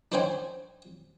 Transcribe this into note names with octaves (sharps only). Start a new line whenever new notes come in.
D4 D#4 C5 C#5 G5 G#5